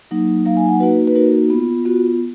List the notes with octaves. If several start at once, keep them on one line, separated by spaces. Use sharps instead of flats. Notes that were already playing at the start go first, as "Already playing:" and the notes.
F#3 A#3 D#4
F#3 A#3 D#4 F5
G#5
F#5
A#3 D#4 F#4 B4
B4
A#3 D#4 F#4 A#4
B3 F4
B3 F4 F#4